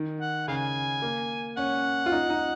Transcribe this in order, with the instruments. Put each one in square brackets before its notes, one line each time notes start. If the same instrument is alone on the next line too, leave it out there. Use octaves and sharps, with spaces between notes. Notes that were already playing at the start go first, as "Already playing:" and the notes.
Already playing: [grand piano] D#3
[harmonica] F#5
[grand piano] C#3 [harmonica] F5 G#5
[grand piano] A#3
[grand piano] C#4 [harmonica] F#5
[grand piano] F4
D#4
D#4